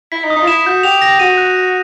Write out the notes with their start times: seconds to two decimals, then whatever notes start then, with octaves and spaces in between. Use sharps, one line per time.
0.12 E4 B6
0.24 D#4
0.30 D#6
0.36 D#4
0.42 F4
0.47 E4 E7
0.66 F#4 G6
0.83 G4 F7
1.02 A#6
1.19 F#4 D#7
1.37 F#6
1.56 A#6